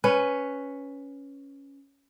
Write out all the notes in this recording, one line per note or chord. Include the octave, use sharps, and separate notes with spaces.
C#4 B4